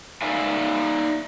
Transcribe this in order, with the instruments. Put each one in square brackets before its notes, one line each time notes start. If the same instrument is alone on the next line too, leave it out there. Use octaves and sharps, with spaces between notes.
[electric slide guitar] D#4 D5 E5 F5 G#5